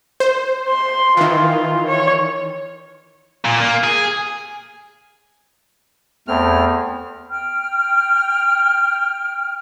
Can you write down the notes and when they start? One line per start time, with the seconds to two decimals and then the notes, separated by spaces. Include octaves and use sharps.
0.20 C5
0.68 C6
1.17 D#3 E3 F4
1.87 C#5
3.45 A#2
3.60 A#3
3.84 G#4
6.28 E2 A3 C4 F6
7.29 G5 F6